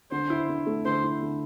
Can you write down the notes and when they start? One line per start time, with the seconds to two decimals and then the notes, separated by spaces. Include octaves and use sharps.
0.11 D3 C5
0.30 E4
0.49 D3
0.67 A3
0.86 D3 C5
1.03 E4
1.22 D3